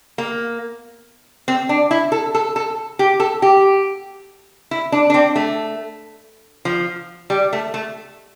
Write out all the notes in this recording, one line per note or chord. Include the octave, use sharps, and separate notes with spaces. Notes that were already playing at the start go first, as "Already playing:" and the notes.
A#3
C4
D4
E4
A4
A4
A4
G4
A4
G4
E4
D4
D4
C4
A3
F3
G3
A3
A3